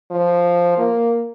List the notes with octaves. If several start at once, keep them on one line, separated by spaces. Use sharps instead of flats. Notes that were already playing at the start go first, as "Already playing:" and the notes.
F3
A#3